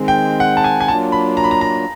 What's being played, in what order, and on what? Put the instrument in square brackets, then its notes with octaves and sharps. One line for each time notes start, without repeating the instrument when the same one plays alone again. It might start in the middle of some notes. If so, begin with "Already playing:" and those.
Already playing: [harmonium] D#3 G#3 C4
[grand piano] G5
F#5
A5
G#5
G#5
[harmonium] F#3 A#3 D4 F4 [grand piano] A5
[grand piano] B5
A#5
B5
A#5
A#5